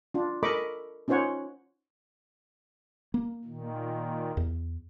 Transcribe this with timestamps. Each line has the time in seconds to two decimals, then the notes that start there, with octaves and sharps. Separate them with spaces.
0.14 D4 F4
0.43 A4 A#4 D#5 B5 C#6 D6
1.08 C#4 D#4 F4 C5 C#5 F#5
3.14 A#3
3.45 A#2 D#3
4.37 E2